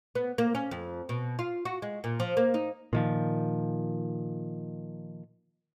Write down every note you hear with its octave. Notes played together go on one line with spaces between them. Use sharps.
B3
A#3
C#4
F2
B2
F4
F#4
G#3
A#2
F3
A#3
D#4
A#2 D#3 F3